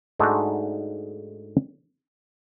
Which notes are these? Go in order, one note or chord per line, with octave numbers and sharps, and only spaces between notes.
G#2 G#3 A3 D4 D#4 F#4